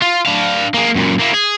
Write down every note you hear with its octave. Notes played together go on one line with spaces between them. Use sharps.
F4
D4 F5
A#3 G#4
F#2 A#2
A#3 E4
G#4